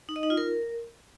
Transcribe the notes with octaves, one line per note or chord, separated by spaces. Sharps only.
D#4
D#5
D#4
F4
A#4